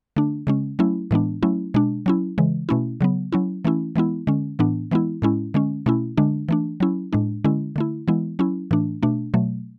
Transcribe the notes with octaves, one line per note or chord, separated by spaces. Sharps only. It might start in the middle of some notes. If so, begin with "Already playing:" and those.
D3 A3 D4
C#3 G#3 C#4
F#3 A3 C#4 E4
A2 E3 G#3 B3 D4
F#3 A3 C#4 E4
B2 G#3 D4
F#3 C#4 E4
C#3 E3 G#3
B2 A3 C#4 E4
C#3 F#3 B3
F#3 C#4 E4
E3 A3 C#4 E4
E3 G#3 B3 E4
D3 G#3 C#4
A2 E3 B3 D4
E3 G#3 B3 E4
A2 G#3 C#4 E4
D3 G#3 C#4
B2 A3 C#4 E4
D3 G#3 D4
E3 A3 D4
F#3 C#4 E4
A2 G#3 D4
D3 G#3 C#4 E4
D3 A3 E4
E3 G#3 B3 E4
F#3 C#4 E4
A2 E3 A3 D4
B2 A3 D4
B2 F#3 A3